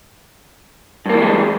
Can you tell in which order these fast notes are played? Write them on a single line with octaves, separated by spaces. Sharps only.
G2 A#3 E3 G3 G#3